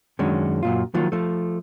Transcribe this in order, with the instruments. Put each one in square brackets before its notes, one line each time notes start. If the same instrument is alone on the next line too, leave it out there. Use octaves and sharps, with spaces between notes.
[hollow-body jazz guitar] F#2 D#3 G#3 C#4 D4
F#2 A#2 F4
D#3 F3 F#3 A#3 F4
F3 A3